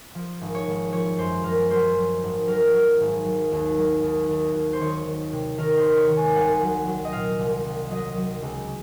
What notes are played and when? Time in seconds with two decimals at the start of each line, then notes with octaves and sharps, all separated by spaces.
0.15 F3
0.41 G#1
0.55 C#5
0.67 G#1
0.93 F3 C#5
1.18 F#2 C5
1.44 F#2 A#4
1.70 F#3 C5
1.96 F#3
2.23 G#1
2.47 F#3 A#4
2.74 F#3
3.00 G#1
3.25 F#3
3.52 D#2
3.77 F#3
4.03 D#2
4.29 D#2
4.55 D#2
4.73 C5
4.81 D#3 C#5
5.06 D#3
5.33 C3
5.58 D#3 A#4
5.77 C5
5.84 C3
5.97 C#5
6.09 D#3
6.17 G#5
6.36 C2 F#5
6.62 F#3
6.87 F#3
7.05 D#5
7.13 A#2 F5
7.39 C2
7.65 C2
7.90 F#3 D#5
8.17 F#3
8.42 C#2